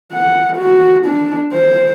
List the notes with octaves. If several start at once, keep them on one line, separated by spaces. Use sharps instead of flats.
F#5
F#4
D4
C5